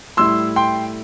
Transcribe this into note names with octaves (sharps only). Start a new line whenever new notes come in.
A2 G3 E4 C6 E6
G5 C6